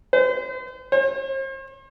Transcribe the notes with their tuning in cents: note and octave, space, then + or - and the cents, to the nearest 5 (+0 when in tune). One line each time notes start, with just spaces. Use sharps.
C5 -40
C5 +45